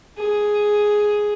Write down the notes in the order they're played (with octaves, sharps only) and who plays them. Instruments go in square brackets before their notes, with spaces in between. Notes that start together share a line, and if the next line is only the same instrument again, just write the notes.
[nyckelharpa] G#4